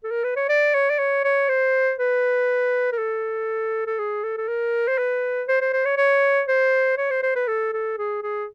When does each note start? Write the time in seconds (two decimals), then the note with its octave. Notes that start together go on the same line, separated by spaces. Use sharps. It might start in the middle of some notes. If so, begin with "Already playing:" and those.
0.04 A4
0.11 A#4
0.24 B4
0.36 C#5
0.49 D5
0.74 C#5
0.90 D5
0.99 C#5
1.24 C#5
1.49 C5
1.99 B4
2.92 A#4
2.98 A4
3.87 A4
3.99 G#4
4.24 A4
4.38 A4
4.48 A#4
4.88 C5
4.98 B4
5.48 C5
5.61 C5
5.73 C5
5.85 C#5
5.98 C#5
6.48 C5
6.98 C#5
7.11 C5
7.23 C5
7.36 B4
7.48 A4
7.73 A4
7.98 G#4
8.23 G#4